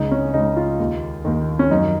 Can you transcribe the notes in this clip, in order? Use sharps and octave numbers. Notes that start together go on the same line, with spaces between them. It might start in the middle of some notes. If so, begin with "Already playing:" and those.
Already playing: C#2 C#3 D#4
C#4
C#2 C#3 D#4
F4
D#2 D#3
D#2 D#3
C#4
F#2 D#3 D#4